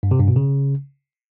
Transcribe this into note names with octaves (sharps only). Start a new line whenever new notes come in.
G2
C3
G2
B2
C#3